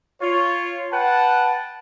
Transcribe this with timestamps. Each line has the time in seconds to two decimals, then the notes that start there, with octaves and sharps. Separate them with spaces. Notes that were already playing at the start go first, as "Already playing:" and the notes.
0.21 F4 C#5
0.93 B4 F#5 G5 A5